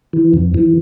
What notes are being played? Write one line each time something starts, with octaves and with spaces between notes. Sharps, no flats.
E3
F2
E3